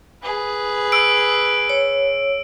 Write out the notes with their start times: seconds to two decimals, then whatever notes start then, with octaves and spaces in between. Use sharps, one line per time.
0.22 G#4 B4
0.92 E6 D7
1.70 C#5